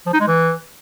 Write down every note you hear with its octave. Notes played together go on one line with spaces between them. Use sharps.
F3
D#4
G#3
E3